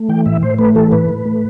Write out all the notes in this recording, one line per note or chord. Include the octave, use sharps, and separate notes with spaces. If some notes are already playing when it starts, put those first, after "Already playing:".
Already playing: A3
E3 G5
A2 E5
A2 C5
A3 B4
E3 A4
A2 B4
A2
A3